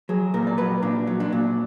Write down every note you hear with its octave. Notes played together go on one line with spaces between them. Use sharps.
F#3 G#4
A#2 A#4
D5
F#3 B4
A#2 D4
F#3
D4
A#2